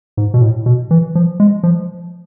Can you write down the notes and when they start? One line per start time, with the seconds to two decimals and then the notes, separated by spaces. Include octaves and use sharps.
0.17 G#2
0.34 B2
0.42 A2
0.66 B2
0.91 E3
1.15 F3
1.40 G#3
1.63 F3